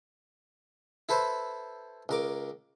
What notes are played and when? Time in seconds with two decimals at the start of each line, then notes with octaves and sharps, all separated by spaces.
1.09 E4 A4 B4 C5
2.09 C#2 A#4 D6